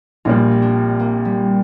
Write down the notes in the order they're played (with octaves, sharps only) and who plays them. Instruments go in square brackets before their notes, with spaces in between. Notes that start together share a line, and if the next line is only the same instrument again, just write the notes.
[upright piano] A#1 A#2 G3 [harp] F4
[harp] C4
D4
A#3
G3